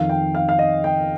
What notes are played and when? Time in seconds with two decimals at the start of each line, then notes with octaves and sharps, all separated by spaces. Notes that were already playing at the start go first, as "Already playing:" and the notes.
Already playing: F2 D#3 F5
0.09 G5
0.35 F5
0.49 F5
0.59 D#5
0.84 G5